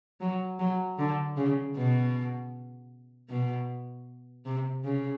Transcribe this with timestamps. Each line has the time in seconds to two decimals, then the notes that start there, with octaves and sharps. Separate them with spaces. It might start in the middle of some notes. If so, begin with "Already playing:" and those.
0.20 F#3
0.59 F#3
0.98 D3
1.37 C#3
1.76 B2
3.30 B2
4.46 C3
4.84 C#3